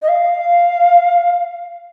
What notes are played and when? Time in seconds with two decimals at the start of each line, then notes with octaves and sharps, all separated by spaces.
0.02 D#5
0.08 F5